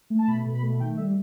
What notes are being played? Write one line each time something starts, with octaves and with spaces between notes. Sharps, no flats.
A3
A5
B2 B5
B2
B5
A3
D#3 G5
G3 E5